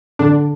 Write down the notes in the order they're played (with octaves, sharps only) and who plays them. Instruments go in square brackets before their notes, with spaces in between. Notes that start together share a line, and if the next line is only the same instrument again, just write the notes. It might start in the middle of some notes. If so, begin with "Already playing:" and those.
[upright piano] D3 [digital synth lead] D4